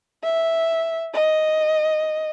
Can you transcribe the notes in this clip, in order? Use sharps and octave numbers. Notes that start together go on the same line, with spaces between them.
E5
D#5